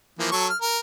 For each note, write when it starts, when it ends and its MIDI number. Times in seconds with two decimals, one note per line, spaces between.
0.19 0.30 52
0.19 0.30 53
0.19 0.30 58
0.32 0.48 54
0.32 0.48 69
0.32 0.48 85
0.49 0.57 89
0.62 0.78 70